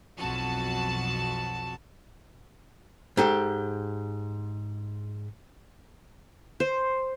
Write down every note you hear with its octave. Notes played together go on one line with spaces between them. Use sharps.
B1 F2 F#4 A5
G#2 G4 A4
C5